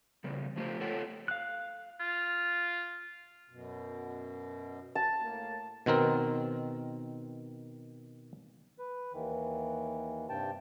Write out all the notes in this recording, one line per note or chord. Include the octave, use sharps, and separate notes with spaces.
F2 C#3 G3
F3 F#3 A3 F4 G4 C5
A3 F4 A4 C#5 F#5 G5
F5 F#6
F4
F#2 B2
A5
A2 A#3
B2 D#3 C4 A#4
B4
D#2 D#3 E3
G2 C3 G5 A5